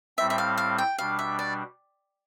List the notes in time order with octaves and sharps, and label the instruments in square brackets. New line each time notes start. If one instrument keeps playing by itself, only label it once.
[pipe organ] A2 G3 C4 [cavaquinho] E5
[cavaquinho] E5
F5
F5
G5
[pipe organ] B2 G3 D4 [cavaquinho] F5
[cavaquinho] E5
D5